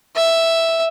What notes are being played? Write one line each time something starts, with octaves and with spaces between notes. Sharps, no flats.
E5